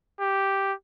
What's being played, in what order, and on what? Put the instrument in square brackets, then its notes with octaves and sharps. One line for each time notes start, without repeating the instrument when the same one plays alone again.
[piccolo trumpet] G4